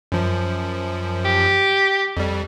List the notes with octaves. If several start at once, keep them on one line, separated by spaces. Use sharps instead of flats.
F#2 F3
G4
F2 G3